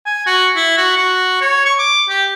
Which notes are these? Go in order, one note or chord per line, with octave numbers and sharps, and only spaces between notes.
G#5
F#4
E4
F#4
F#4
C#5
C#6
D6
G4